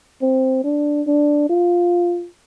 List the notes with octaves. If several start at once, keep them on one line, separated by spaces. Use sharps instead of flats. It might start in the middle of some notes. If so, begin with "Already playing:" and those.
C4
D4
D4
F4